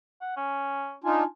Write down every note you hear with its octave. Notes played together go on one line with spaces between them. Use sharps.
F#5
C#4
D4 D#4 F4 G#5